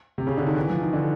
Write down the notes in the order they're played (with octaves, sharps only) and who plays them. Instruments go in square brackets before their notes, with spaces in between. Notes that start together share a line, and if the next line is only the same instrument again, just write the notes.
[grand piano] C3
C#3
D3
D#3
E3
F3
D#3
D3